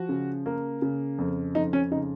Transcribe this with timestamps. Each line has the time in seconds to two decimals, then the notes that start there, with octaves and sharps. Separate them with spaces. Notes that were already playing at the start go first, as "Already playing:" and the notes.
Already playing: F3 F#4
0.09 C#3
0.46 A#3
0.82 C#3
1.18 F2
1.55 F2 D#4
1.73 C#4
1.91 C#3 D#4